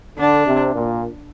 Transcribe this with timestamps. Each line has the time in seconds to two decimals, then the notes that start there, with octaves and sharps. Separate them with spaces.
0.18 D3 D4
0.47 C3
0.75 A#2